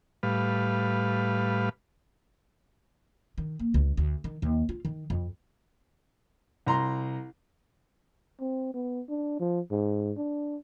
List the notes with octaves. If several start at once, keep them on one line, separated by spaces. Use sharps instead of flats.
A2 G3 B4 F5
D#3
A#3
C#2
D2
D#3
D#2
F4
D#3
F2
C2 A#5 C6
C4
B3
D4
F3
G#2
D4